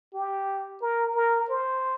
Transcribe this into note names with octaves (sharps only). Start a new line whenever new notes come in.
G4
A#4
A#4
C5